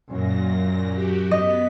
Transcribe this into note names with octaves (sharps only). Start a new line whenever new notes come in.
F#2 A#2 A#6
F#4 G4
B3 D#5 B6